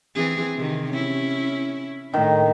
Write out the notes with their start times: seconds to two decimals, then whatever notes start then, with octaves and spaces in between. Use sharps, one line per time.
0.15 E3 C4 G#4
0.57 C3 D#3
0.92 C#4 E4
2.14 A2 D#3